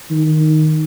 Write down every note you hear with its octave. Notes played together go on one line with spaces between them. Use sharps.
D#3